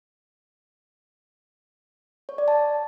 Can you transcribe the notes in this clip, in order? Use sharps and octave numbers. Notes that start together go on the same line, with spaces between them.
C#5
D5
A5